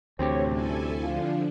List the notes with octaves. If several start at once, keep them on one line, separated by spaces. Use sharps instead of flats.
D2 A2 C3 E3 C4 G4 C#5
G3 C#4 E4 A4 G#5
D3 F3 D4 F4